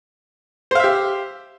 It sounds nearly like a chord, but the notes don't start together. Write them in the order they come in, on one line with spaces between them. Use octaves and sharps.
C5 F5 E5 G4